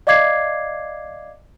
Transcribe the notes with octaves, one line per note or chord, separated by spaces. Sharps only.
D5 D#5 F5 D6 G#6 C7